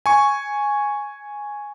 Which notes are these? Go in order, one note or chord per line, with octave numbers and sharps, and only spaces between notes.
G#5 C#6